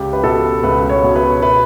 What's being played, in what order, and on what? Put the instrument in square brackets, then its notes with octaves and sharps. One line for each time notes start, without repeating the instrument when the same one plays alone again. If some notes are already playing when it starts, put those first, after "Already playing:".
Already playing: [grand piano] C#2 G4
B4
B2 A4
C#2 B4
C#5
B2
B4
B4